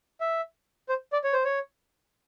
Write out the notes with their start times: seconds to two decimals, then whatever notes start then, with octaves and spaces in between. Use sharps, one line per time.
0.20 E5
0.89 C5
1.13 D5
1.24 C#5
1.33 C5
1.45 C#5